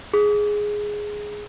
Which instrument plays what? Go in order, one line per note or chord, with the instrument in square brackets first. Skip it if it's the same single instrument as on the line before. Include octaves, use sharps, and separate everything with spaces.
[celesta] G#4